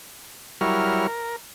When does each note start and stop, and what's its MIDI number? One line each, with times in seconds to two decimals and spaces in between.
0.61 1.07 54
0.61 1.07 55
0.61 1.07 64
0.61 1.07 70
0.61 1.07 73
0.61 1.07 89
1.07 1.36 70